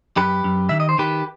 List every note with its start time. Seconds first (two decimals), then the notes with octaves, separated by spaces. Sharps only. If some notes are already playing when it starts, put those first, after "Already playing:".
0.17 F#2 G4 B4
0.44 F#2
0.69 D#3 E5
0.80 D#5
0.89 C5
0.98 D#3 G4 B4